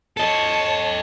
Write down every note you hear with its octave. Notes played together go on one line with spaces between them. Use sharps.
A4 C#5 D#5 A5